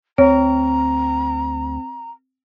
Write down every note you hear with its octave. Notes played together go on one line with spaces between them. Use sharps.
D2 C4 C#5 A#5